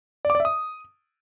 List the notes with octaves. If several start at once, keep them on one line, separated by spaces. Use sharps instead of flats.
D5
D6
D5
E5
D#6